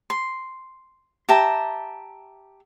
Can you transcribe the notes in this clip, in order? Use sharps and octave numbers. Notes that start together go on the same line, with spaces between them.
C6
G4 E5 A5 A#5